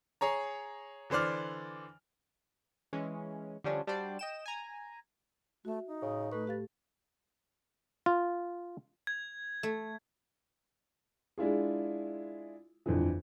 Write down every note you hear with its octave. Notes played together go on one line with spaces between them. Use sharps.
G#4 C#5 A#5
D3 E3 C5 D5 F6
E3 G#3 C#4
D3 F3 G3 C#4 D4
G3 D4 F#4 C5 D5
D#5 G5 E7
G#5 A#5
A3 F#4 E5
D#4
A2 C#3
A3 A4 B4 C#6
G4 F5 A6
F4
G#6
A3
G#3 D4 E4 F4 G#4
G1 F2 D3 E3